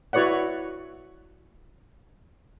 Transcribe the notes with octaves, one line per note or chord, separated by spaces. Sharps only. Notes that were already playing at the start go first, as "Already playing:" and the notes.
E4 F#4 B4 C#5 D5 F#5